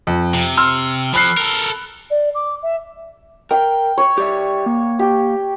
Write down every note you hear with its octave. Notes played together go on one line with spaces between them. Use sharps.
F2
C3
C6 E6 F6
F3 A4 B5 F#6 C7
A4 A#4
D5
D6
E5
A#4 G5
C#5
G4 D5 E5
A#3
G4